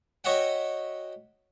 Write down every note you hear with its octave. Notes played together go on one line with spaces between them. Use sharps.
F#4 C#5 D#5 E5 F#5 G5